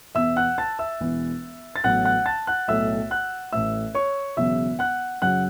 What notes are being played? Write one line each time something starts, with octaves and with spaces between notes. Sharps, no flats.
E2 B2 B3 E5 E6
F#5 F#6
A5 A6
E5 E6
E1 E2 E3
A6
A1 A2 F#3 B3 F#5 F#6
F#5 F#6
A5 A6
F#5 F#6
B1 A2 A3 E5 E6
F#5 F#6
A1 A2 A3 E5 E6
C#5 C#6
E1 E2 C#3 F#3 E5 E6
F#5 F#6
F#2 C#3 F#3 F#5 F#6